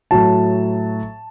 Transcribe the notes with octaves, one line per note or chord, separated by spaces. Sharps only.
A2 F#3 A5